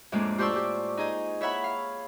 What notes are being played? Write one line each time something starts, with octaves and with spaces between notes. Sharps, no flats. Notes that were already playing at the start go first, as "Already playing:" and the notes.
F2 A2 G#3 A#3 D4
F4 G4 C5 D5 C#6 E6
G4
D#4 G#4 D#5
E4 C#5 E5 F#5 B5
F5